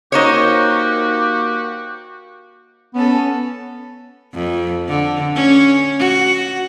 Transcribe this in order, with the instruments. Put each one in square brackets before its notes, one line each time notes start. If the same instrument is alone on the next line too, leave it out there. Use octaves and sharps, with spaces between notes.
[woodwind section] A#3 F#4 G4 [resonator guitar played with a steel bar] D#4 C5 C#5
[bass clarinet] B3 [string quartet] C#4 A4
[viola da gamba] F2
D3
C#4
F#4